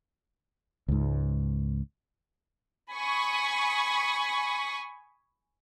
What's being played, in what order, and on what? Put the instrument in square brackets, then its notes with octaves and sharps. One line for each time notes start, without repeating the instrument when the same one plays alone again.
[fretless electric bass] C#2 G#2
[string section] G#5 B5 C#6 D#6